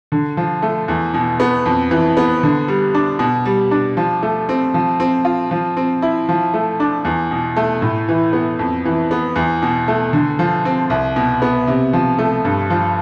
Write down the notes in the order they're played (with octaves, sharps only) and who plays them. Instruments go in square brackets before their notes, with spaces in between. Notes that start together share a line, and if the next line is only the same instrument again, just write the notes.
[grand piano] D3
F3
A3
E2
B2
B3
F2
E3
B3
D3
G3
D4
B2
G3
D4
F3
A3
C4
F3
C4
F4
F3
C4
E4
F3
A3
D4
E2
B2
A3
A2
E3
B3
F2
E3
B3
E2
B2
A3
D3
F3
C4
C2
B2
B3
C3
F3
A3
G2
F3